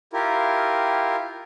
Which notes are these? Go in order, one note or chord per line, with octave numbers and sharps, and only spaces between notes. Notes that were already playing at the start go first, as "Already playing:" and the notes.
E4 F4 G4 A#4